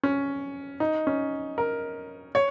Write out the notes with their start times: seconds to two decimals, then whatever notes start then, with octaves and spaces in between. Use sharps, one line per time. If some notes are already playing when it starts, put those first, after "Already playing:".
0.03 C#4
0.80 D#4
1.07 C#4
1.58 A#4
2.35 C#5